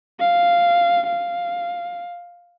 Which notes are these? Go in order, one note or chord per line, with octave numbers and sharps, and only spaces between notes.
F5
F5